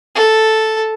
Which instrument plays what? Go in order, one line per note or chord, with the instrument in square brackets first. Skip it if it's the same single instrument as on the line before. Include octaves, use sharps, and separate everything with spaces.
[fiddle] A4